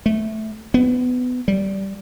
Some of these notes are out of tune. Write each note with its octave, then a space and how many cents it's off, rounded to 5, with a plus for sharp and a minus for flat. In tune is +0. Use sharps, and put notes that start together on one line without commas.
A3 -10
B3 +20
G3 -15